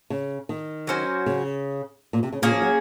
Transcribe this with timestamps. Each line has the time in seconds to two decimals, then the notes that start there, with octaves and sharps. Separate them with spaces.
0.10 C#3
0.49 D#3
0.87 F#3 C#4 F#4 C5
1.26 C#3
2.13 A#2
2.23 C3
2.33 C#3
2.42 A#2 A#3 C#4 G#4
2.52 F3
2.62 F#3